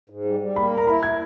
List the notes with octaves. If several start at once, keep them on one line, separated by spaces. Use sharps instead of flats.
G#2
G3
G3
A#3 B5
A#4
A#5
E4 B5
G#6